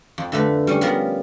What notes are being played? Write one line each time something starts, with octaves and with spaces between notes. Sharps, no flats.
F2
D3 A3 B4
G3 C#4
F3 G3 B3 A#4